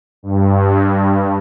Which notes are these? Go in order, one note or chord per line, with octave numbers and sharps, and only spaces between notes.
G2